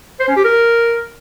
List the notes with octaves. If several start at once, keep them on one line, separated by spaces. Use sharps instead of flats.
C5
C#4
G4
A#4